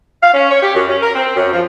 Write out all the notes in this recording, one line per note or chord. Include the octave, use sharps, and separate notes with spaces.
F5
C#4
C#5
G4
F#2
C#4
A#4
C4
F#2
F3